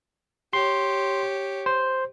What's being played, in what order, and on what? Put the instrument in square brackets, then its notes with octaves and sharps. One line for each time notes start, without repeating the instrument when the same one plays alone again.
[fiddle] G4 C#5 [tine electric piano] C6
[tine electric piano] C5